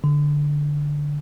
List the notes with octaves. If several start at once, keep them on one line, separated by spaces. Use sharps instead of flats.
D3